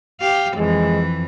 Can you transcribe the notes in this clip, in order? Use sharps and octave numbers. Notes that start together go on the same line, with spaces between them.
G4 F5
F2 E3 G#3